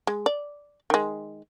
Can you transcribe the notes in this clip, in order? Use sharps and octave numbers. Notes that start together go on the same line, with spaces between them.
G#3
D5
D#3 G#3